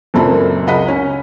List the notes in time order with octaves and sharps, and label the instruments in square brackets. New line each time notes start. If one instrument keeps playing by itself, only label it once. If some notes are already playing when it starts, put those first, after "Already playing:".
[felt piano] F#1 F#2 A#2 C4 A4 B5
C#2 D#5 F#5 B5 B6
C#4